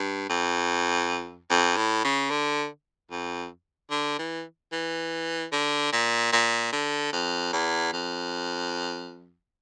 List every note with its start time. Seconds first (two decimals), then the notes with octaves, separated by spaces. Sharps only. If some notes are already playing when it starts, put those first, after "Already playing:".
Already playing: G2
0.29 F2
1.50 F2
1.77 A2
2.04 C#3
2.30 D3
3.11 F2
3.91 D3
4.18 E3
4.72 E3
5.52 D3
5.92 A#2
6.32 A#2
6.73 D3
7.12 F2
7.53 E2
7.93 F2